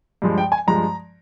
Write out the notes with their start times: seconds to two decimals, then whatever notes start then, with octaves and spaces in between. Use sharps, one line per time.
0.22 G2 F3 G#3
0.38 G5
0.52 G#5
0.67 G2 F3 G#3 A#5